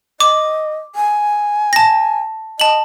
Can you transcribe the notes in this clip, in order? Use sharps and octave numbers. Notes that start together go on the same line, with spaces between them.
D#5 D6
G#5
A5 A#6
D#5 A5 F#7